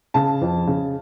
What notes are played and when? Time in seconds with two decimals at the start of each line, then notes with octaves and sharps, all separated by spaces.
0.14 C#3 A5
0.41 F2
0.67 C#3